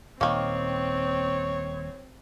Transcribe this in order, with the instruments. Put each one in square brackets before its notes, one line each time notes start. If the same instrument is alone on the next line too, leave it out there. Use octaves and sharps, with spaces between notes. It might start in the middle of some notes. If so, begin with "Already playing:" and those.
[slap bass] D#1 [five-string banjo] D#3 A#3 [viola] C4 [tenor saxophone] C#5